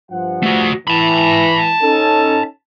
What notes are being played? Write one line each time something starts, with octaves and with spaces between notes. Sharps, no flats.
G2 F3 F#5
A3 F#4
E3 A5 B5
C#4 D#4 A4